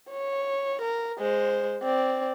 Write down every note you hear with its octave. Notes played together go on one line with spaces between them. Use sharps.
C#5
A#4
G#3 C5
C4 D5